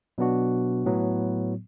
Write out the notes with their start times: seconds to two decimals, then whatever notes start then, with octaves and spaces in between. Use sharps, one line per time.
0.18 B2 F#3 B3 D4 F#4
0.86 A2 F#3 B3